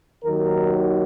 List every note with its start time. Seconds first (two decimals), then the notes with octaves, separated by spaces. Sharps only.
0.24 D#2 D#3 F#3 A#4